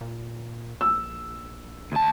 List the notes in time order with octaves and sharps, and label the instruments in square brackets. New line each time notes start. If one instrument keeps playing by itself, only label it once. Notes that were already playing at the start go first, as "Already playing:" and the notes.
[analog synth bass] A#2
[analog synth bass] A#1 [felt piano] E6
[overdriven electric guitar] D2 A5